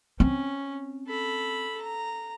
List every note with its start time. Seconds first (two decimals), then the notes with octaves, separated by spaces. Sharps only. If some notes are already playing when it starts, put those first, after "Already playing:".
0.20 C4 C#4
1.08 A4 B5
1.82 A#5